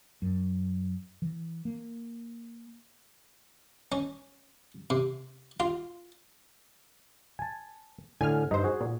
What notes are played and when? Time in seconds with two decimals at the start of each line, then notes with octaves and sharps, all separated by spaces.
0.22 F#2
1.22 E3
1.65 A#3
3.92 C#4
4.90 C3
5.60 F4
7.39 G#5 A5
8.21 A2 D3 G#5 F6
8.51 G2 D#4 C5
8.64 F#4 G#4
8.80 A#2